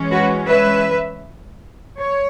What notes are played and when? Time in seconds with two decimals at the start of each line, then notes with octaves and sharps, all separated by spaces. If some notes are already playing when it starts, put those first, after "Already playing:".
Already playing: E3 G#3 C#4
0.11 F#4 B4
0.48 B4 E5
2.00 C#5